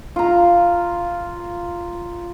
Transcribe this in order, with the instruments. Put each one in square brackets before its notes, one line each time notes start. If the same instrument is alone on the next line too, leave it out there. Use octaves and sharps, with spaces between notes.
[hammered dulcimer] F4 A#5